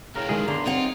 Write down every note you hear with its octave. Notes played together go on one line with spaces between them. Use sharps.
C#2 A2 C#3 A#4
D#3 G#3 G#4
E2 D3 A#5 C6
C4 D#4 F4 C#5 F#5